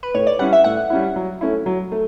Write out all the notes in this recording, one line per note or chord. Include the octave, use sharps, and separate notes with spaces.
B4
A2 C#5
D5
G3 C#4 E4 F#5
E5
A2 F#5
G3 C#4 E4
F#3
A3 C#4 E4
F#3
A3